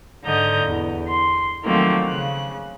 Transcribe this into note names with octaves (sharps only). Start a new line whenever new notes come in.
G#2 D3 D#5 A#5 G6
E2
C6
D#3 F3 F#3 A3 A#3 C4
C#3 F#6